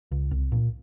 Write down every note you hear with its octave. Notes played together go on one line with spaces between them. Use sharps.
C#2
C2
A#2